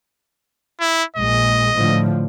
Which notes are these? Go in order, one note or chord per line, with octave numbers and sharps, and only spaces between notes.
E4
A#1 G#3 D#5
A2 D3 F3